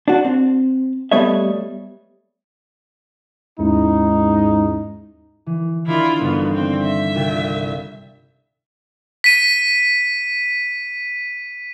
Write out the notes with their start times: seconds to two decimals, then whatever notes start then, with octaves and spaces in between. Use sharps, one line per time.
0.08 D4 F#4
0.25 C4
1.11 G3 A3 B3 C#5 D#5 E5
3.59 D#2 G#2 C#4 D#4 E4
5.46 E3
5.87 D#3 D4 E4 F4
6.21 G1 B3 F5
6.54 C4
6.82 E5
7.14 C2 F4 G5
9.24 B6 D#7